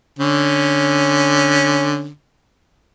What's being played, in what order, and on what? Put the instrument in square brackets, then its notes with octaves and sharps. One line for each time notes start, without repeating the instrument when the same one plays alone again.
[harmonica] D3 C#4